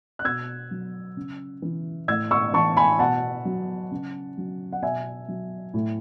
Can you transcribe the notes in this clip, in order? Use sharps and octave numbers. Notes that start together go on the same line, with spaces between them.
F#6
B2 E6 G#6
F#3
C#3
E3
A2 E6 G#6
C#6 E6
E3 A5 C#6
G#5 B5
B2 F#5 A5
F#3
C#3
F#3
F#5
B2 E5 G#5
F#3
A2